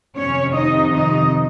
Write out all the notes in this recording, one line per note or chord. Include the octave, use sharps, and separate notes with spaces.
F2 C3 D#3 C#4 C#5
D#4 D#5
D#4 D#5